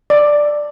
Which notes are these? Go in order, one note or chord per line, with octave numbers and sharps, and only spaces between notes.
D5